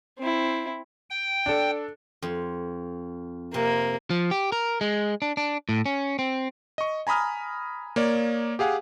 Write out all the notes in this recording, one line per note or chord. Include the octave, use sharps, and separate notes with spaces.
C4 E4
G5
D4 A4
F2
C3 A#3
F3
G4
A#4
G#3
D4
D4
A2
C#4
C4
D#5 C#6
G#5 A#5 B5 D#6 F6
A#3 C#5 D5
G4 G#4 F5 F#5 G#5